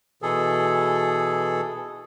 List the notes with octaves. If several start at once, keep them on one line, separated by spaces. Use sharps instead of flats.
B2 E3 G#4 A4